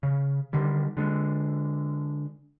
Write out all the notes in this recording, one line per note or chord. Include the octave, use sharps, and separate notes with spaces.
C#3
D3 D#3 G3
D3 G#3